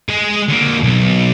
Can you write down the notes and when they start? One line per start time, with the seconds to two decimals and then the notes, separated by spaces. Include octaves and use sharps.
0.09 G#3 G#4
0.48 D3 A#3
0.83 B1